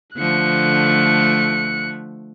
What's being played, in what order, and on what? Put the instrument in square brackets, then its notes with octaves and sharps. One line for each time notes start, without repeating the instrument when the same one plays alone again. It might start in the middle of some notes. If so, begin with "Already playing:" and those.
[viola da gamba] D3 F3 A3 [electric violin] F#6 C#7